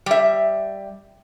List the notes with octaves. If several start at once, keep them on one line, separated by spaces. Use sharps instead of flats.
G3 E5